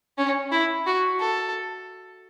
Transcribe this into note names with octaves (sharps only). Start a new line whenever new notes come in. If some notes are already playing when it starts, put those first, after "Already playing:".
C#4
E4
F#4
A4